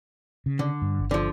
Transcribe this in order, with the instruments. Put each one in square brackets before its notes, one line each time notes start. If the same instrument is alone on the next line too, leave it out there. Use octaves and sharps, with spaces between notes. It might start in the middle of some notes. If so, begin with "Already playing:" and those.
[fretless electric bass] C#3
[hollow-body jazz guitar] D3
[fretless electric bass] G2
G1
[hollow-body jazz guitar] D3 F3